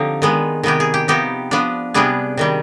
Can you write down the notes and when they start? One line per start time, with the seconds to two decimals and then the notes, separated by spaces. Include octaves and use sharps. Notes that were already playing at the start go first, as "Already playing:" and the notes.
Already playing: D3 F3 C4 D#4 G4
0.22 D#3 G#3 B3
0.63 C3 D#3 B3 G4
0.80 G#4
0.94 G4
1.08 C3 F3 B3 D#4 G4
1.51 F3 B3 D4
1.94 C3 G3 B3 D4 G#4
2.37 C3 D#3 G3